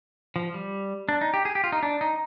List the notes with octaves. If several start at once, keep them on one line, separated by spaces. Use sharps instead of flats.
F3
G3
D4
D#4
G4
G#4
G4
F4
D#4
D4
D#4